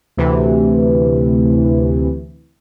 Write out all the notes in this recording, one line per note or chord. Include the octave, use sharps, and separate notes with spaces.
D2 C3 E3